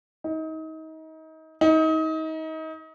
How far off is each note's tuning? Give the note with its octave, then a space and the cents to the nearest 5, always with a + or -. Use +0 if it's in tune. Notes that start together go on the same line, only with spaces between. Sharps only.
D#4 +30
D#4 +30